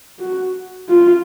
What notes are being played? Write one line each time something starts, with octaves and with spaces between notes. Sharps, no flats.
F#4
F4